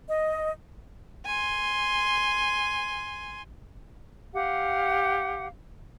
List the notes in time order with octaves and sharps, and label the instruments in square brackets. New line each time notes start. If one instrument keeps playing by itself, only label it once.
[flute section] D#5
[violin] G#5 C6
[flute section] G4 F5 F#5